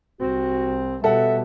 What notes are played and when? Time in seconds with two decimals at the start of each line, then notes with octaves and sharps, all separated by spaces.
0.21 C2 C4 F#4
1.04 B2 G3 A4 E5 F#5